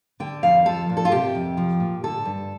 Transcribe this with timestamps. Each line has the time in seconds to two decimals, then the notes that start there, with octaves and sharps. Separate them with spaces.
0.20 D3 G5
0.43 F2 F5
0.65 F3 A4
0.90 A#2
0.97 A4
1.05 F4
1.12 C3 G4
1.35 F2
1.57 F3
1.80 A#2
2.04 D3 A4
2.25 G2